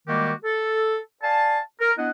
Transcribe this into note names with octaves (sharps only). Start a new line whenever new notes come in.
D#3 G3 G#3 A#3 F#4 G4
A4
D5 F5 G#5 A5
A#4
B3 D4 E4 D#5 F#5